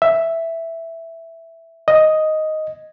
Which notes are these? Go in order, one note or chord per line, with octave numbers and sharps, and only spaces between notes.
E5
D#5